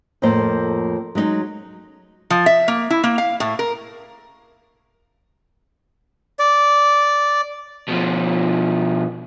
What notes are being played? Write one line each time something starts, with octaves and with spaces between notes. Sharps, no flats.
F2 A2 F3 A#3 C5
F#3 G#3 C4 D#4
F3
E5
A#3
E4
A#3
F5
A2
A#4
D5
B2 F3